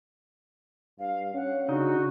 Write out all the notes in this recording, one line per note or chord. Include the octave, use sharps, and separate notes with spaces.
G2 F5
C#4 F#5
C#3 D4 D#4 F#4